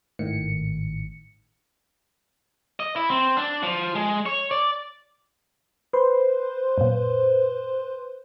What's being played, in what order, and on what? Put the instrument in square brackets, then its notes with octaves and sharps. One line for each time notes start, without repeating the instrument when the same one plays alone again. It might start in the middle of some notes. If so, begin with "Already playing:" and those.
[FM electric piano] G#1 A2 D#3 C#7
[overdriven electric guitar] D#5
E4
C4
D4
F3
G#3
C#5
D5
[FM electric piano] B4 C5 C6
[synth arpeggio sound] F#2 A#2